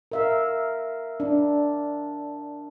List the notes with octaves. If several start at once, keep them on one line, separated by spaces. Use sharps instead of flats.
A#4 E5 F5
D4